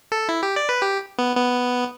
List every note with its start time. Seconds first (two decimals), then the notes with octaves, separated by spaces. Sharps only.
0.12 A4
0.29 E4
0.43 G4
0.56 D5
0.69 B4
0.82 G4
1.18 B3
1.36 B3